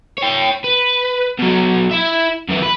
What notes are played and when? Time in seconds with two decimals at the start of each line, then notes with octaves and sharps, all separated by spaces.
0.18 C#5 G5
0.64 B4
1.39 B2 F#3
1.91 E4 E5
2.49 F#2 E3
2.62 B4